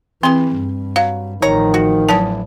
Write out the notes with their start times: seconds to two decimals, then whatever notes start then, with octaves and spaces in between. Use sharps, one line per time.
0.23 E3 C4 G#4 C6
0.56 G2
0.96 F#3 F5
1.42 A1 D#3 F3 C#5 A#5
1.74 F#4
2.09 D3 E3 F#3 B3 A5